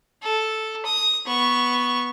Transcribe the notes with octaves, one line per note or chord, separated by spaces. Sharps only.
A4
D#6
B3 C#6